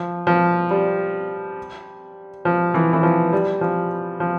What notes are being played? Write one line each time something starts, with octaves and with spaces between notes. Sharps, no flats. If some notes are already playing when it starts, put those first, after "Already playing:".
Already playing: F3
F3
G3
F3
E3
E3
F3
G3
F3
F3